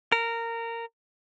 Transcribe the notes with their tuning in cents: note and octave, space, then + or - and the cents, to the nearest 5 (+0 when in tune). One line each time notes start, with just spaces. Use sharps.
A#4 -15